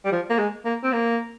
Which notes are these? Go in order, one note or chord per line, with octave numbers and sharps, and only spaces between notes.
G3
F3
A#3
G#3
A#3
C4
A#3